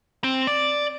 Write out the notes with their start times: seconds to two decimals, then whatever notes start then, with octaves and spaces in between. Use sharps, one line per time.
0.24 C4
0.47 D5